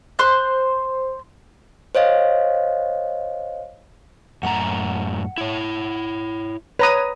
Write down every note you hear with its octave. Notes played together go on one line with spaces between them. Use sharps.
C5 C6 F#6
C5 C#5 D#5 F5
F#2 A2 F#5 A#5
E4 C#5
B4 C#5 A#5 D#6